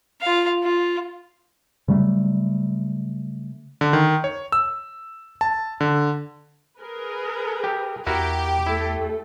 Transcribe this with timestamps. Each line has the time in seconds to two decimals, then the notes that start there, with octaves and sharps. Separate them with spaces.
0.21 F4 F5
0.63 F4
1.88 C#3 F#3 G3 A3
3.81 D3
3.93 D#3
4.24 C#5
4.52 E6
5.41 A5
5.81 D3
6.79 G#4 A#4 B4
7.64 G4
8.07 E2 E4 F#4 G4 A#4
8.66 A3 E4 A4